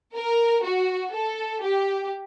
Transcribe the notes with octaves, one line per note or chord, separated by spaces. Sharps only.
A#4
F#4
A4
G4